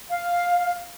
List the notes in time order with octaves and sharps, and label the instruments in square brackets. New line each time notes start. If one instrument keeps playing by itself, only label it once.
[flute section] F5